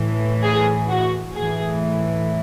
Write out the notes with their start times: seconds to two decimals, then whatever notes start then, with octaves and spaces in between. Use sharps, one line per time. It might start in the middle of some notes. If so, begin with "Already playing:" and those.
Already playing: A2 E3
0.44 G#4
0.90 F#4
1.35 A2 E3 G#4